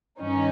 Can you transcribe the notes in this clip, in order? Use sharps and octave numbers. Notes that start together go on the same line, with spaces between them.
G2 D#3 C#4 D#4